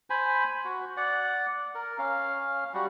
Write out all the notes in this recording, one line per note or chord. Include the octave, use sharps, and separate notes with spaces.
C5 G#5 B5
F#4
D5 F#5
A#4
C#4 F5
G3 F#4